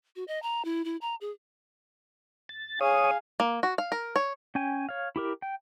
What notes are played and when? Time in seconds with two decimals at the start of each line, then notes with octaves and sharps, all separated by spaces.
0.16 F#4
0.28 D#5
0.42 A#5
0.65 E4
0.84 E4
1.01 A#5
1.21 G#4
2.49 A6
2.81 G#4 C#5 F5 G#5 D#6
3.40 A#3
3.63 F#4
3.78 F5
3.92 A#4
4.16 C#5
4.55 C#4 G5 G#5
4.89 C#5 F5
5.16 E4 G4 A#4
5.42 G5